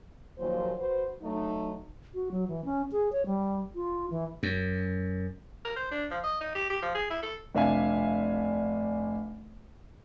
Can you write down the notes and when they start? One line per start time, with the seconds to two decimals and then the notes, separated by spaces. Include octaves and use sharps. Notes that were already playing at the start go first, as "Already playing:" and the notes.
0.38 D#2 A#2 F3 F#3 C5
0.78 F#4 B4 C5
1.22 F#3 A3 D#4
2.14 F#4
2.31 F#3
2.48 E3
2.65 C#4
2.92 G#4
3.12 C#5
3.26 G3
3.75 F4
4.10 E3
4.43 F#2
5.65 A#4
5.76 C5
5.91 D4
6.11 F3
6.23 D#5
6.41 D#4
6.55 G4
6.70 G4
6.82 F3
6.95 G#4
7.10 E4
7.23 A4
7.55 F1 C3 D4 E5 F5 G#5